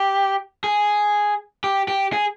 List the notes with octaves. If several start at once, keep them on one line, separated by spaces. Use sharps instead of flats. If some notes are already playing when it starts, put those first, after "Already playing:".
Already playing: G4
G#4
G4
G4
G#4